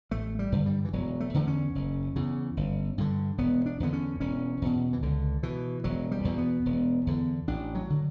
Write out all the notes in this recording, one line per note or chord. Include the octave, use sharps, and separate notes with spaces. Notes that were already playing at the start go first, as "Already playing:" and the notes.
A1 A3
G3
G2 D3
G3
E3
E1 F#3
A3
E2 D3
C#4
F#1
E2 C#3
G1
G2 D3
E1 B3
D4
E2 D3 B3
C#4
E1 C#4
E2 B2
E3
C#2 D3
B2 E3
E1 F#3
G3
E2 B2
B3
E1
E2 D3
A1 D4
F#3
D3